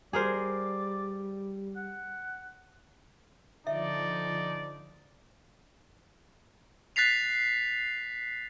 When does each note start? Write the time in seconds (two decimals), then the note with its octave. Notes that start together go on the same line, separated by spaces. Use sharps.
0.13 G3 G#4 A#4 C5 D5
1.76 F#5
3.67 D3 F3 D#4 D5 E5
6.96 F#6 A6 B6 C7 F7